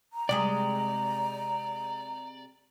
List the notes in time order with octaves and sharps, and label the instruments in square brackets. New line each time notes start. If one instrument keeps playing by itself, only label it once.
[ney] A#5
[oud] C3 G#3 G#4 [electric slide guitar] D5